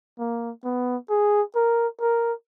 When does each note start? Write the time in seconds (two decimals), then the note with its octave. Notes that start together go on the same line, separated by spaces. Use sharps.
0.19 A#3
0.64 B3
1.10 G#4
1.55 A#4
2.00 A#4